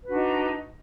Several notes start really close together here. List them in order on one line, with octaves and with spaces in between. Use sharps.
B4 F#4 D4 D#4